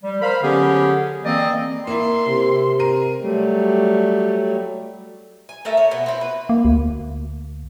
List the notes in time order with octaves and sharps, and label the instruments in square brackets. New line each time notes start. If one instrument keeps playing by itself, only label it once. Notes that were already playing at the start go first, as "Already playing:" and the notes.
[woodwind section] G3
A#4 C5 F5 B5
D3 F#3 B3 C#4 G4 G#4
E3 A#3 C4 D5 D#5
[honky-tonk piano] A#3 E4 [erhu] C6
[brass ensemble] C3
[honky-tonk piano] A#4 D#7
[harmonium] F#3 G3 A3
[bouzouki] G#5
A3 A4 A#4 E5
C#5
B2 B3
C4 E4
B4
[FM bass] A#3
D2